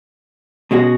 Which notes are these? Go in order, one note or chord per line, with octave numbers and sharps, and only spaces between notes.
B2 G#3 C#4 F#4